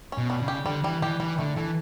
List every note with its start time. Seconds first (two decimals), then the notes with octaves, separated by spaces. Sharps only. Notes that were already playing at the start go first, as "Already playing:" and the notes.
0.12 C#4
0.18 B2
0.30 G3
0.42 C#3
0.48 G4
0.66 D3 G3
0.84 E3 G3
1.02 E3 G4
1.20 E3 G3
1.38 D3 A3
1.56 E3 A4